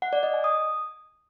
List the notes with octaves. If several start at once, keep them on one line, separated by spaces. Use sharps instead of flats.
F#5
D5
D#5
G#5
D#6